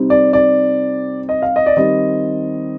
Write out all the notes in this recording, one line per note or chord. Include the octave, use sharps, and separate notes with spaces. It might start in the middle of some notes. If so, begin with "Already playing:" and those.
Already playing: C3 G3 C4 D#4
D5
D5
D#5
F5
D#5
D5
D#3 G3 C4 D#4 D#5